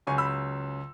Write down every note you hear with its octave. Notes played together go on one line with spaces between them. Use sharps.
C#2 C#3 F#3 G#5 C#6
B5 E6